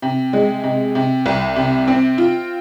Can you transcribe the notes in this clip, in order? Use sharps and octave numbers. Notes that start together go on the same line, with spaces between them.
C3
G#3
C3
C3
C2
C3
C4
F4